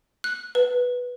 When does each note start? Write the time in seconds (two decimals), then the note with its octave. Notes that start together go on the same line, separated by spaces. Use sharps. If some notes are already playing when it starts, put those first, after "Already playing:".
0.24 F#6
0.55 B4